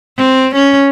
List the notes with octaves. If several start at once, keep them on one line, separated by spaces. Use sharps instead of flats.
C4
C#4